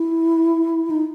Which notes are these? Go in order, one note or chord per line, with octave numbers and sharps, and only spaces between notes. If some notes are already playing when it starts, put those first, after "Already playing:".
Already playing: E4
D#4